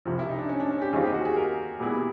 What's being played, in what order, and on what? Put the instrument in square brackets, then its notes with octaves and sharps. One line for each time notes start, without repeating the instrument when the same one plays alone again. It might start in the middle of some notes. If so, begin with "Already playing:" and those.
[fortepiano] C2 C3 F3
[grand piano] E4
D#4
D4
C#4
D4
C#4
G4
[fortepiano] D#2 D#3 G3 C4 F4 [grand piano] G#4
[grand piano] G4
F#4
G#4
A#4
[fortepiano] A#2 G3 B3 E4 G#4